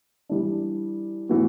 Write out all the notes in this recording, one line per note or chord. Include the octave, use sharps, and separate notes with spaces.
E3 G3 D4
A2 E3 B3 F#4